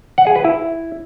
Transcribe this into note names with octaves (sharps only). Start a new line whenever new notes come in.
F#5
G#4
B4
E4